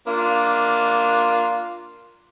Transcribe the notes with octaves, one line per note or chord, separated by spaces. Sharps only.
A#3 D4 F4